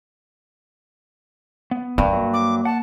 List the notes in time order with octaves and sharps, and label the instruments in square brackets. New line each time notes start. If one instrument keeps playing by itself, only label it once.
[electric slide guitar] B3
[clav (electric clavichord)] G2 [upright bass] A#3
[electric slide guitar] F#3
[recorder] D6
[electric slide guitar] F#5 [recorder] A5